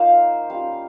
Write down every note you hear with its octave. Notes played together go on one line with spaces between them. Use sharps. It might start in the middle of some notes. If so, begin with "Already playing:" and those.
Already playing: A#3 D#4 F4 C5 F5
G3 C#4 F4 F5